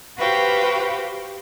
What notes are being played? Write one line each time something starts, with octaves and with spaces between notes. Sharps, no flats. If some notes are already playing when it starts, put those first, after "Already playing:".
F#4 G4 B4 C5 F5 G5